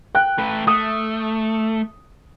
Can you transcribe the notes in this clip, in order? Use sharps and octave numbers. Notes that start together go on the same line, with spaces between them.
G5 F#6
A3 B4
A3 D#6